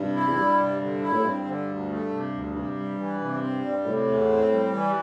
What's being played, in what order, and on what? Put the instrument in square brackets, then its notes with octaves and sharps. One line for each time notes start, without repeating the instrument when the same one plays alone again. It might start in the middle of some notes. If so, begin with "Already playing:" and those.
Already playing: [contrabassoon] G2 [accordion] C3
[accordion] E4
[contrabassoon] E2
[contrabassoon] G2 [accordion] G3
[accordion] C3
D3
E4
[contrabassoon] A2
[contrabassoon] G2 [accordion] C4
[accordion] D3
D2
A3
C3
D2
[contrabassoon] G2 [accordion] C3
[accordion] G3
E3
C3
C4
G3
[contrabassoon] A2 [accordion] C3
[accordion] E2
C4
G3
E3